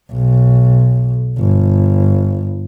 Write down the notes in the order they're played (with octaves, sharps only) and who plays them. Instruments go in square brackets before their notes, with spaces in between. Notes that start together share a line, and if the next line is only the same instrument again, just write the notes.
[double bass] B1
G1